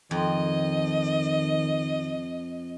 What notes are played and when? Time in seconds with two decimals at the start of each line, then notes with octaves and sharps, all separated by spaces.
0.11 F2 D#3 D#5